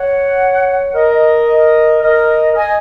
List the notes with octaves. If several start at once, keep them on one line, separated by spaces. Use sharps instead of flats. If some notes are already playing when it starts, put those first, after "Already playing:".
Already playing: C#5 F#5
A#4 D#5
A#4 D#5
D#5 G#5